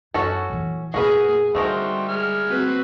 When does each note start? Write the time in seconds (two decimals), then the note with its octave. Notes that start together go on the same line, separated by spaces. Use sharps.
0.14 F#2 C#4 F#4 A4
0.50 A#2 E3
0.94 F2 A#2 F#4 G#4 A#4 B4
1.55 D3 G3 A3 D#4 F#4 A#4 C5 G5
2.08 G#3 F6
2.48 C4 F#4 B4